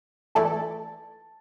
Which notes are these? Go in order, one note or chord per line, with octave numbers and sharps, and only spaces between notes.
E3 A3 E4 A4 D5 A5